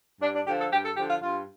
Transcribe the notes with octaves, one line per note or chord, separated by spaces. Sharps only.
G2 D4
D4
D3 F3 G4
A4
G2 G4
A4
D3 F3 G4
F4
G2 F4